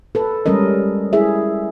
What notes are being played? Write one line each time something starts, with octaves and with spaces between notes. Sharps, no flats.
A4 B4
G3 G#3 C#4 A#4 D#5
E4 G#4 E5